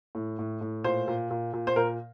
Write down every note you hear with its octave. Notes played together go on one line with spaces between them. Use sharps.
A2
A2
A2
A#2 C5
A#2
A#2
A#2
C5
A#2 A#4